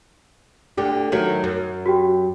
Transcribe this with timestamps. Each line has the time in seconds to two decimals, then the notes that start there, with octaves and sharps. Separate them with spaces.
0.77 D2 D3 G4
1.12 D#3 F#3 A3
1.44 F#2
1.86 F#4 G4 G5